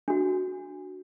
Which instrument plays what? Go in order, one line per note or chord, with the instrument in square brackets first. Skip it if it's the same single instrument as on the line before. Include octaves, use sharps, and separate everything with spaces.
[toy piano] D4 F#4